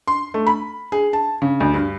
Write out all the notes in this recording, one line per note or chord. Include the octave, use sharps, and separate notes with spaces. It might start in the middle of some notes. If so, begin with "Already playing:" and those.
C6
A3
B5
G#4
A5
C#3
D2
G2